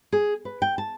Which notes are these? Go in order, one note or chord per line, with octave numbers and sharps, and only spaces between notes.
G#4
B4
G5
A5